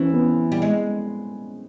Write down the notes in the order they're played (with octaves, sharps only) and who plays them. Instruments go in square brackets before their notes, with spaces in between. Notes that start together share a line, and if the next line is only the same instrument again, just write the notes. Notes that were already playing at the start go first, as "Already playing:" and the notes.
Already playing: [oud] E3 [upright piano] C4 C#4
[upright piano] B3
[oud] G3
G#3